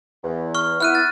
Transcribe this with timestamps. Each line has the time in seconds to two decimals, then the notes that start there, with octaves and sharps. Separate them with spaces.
0.23 E2
0.55 C#6 F6
0.81 B3 E4 F6 F#6 D#7
0.95 A6